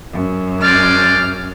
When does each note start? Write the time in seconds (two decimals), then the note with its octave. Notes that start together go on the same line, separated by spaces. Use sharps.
0.13 F#2
0.61 G#3 C5 D5 F6